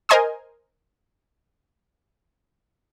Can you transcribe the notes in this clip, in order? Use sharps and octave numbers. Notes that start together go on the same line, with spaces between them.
A#4 C5 D#5 G#5 C6 D#6